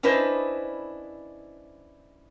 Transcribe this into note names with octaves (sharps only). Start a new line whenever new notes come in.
C#4 D4 E4 B4 C5 D#5